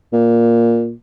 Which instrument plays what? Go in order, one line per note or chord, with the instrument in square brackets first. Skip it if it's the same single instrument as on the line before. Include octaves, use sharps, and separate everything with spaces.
[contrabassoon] A#2